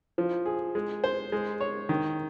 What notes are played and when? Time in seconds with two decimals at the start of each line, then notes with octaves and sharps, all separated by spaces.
0.18 F3
0.46 G#4
0.75 G#3
1.04 C5
1.32 G#3
1.60 C#5
1.89 D#3